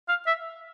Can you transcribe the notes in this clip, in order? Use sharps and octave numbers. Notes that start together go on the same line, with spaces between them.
F5
E5